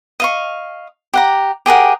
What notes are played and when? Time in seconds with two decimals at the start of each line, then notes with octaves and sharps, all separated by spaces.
0.20 D#5 F5 C#6
1.14 G4 F#5 A#5
1.66 G4 G#4 A#4 F#5